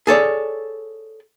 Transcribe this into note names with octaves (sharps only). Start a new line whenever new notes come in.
G#4 A4 C#5 D5